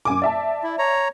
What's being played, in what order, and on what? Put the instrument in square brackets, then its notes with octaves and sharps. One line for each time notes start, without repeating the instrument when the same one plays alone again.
[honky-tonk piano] F#2 G#5 D6
D5 E5 A5
[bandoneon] E4
C#5 A#5